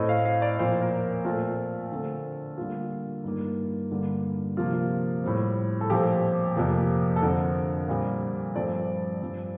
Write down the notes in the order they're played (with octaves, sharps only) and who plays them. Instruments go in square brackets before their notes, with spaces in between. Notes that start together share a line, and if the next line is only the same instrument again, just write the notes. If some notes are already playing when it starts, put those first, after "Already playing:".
Already playing: [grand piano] A2 A3 C4 D#5
F5
F5
D5
A#2 F3 A#3 C5
A#4
A#2 A3 C4 F4
D3 A3 C4
D3 G3 A#3 F4
G2 D#3 A#3
G2 D3 G3 A#3
C3 F3 A#3 F4
F4
A2 G3 C4
A4
A#2 F3 A3 C4 G4
F2 C3 F3 A#3
A4
F2 D3 F3 C4 A#4
A#2 G3 C4
G2 F3 A3 C4 D5
G2 F3 C4